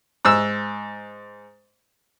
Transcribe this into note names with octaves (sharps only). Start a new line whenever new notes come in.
G#2 E6